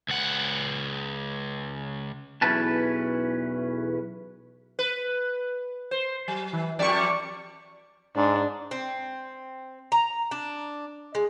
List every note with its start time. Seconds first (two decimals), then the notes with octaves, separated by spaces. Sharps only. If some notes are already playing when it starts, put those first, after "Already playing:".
0.08 C#2 F#5
2.42 B1 E2 E3 C#4 B4 A5
4.79 B4
5.91 C5
6.28 F#3
6.53 E3
6.79 F2 G3 D5 C#6
8.16 G#2 D4
8.71 C4
9.92 A#5
10.31 D4
11.15 G#3